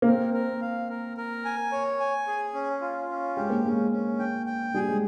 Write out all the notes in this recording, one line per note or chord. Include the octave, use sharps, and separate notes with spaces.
A#3
C4 A#4
A#4
F5
A#4
A#4
G#5
C#5
G#5
G#4
C#4
F4
C#4
G#3 G4
A#3
G#3 C#4
C#4
G5
G5
G3 G#4
G#3